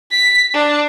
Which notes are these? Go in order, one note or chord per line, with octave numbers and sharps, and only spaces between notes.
B6
D4